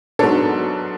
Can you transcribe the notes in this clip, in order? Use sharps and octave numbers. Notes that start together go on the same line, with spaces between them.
G#2 F#3 B3 D4 A4 C#5